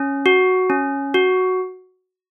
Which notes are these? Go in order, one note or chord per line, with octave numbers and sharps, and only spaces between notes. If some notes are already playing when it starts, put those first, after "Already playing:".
Already playing: C#4
F#4
C#4
F#4